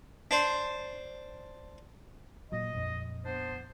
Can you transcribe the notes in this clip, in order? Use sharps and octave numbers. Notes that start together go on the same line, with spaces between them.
D4 C5
A#2 F#3 D#5
A#1 F2
B3 D4 C5